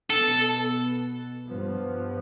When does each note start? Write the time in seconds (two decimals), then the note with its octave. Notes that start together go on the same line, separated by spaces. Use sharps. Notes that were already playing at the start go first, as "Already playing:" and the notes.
0.10 B2 B3 A4
1.47 G2 F3 B3